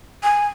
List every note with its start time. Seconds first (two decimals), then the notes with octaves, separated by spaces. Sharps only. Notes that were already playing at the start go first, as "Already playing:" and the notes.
0.24 G#5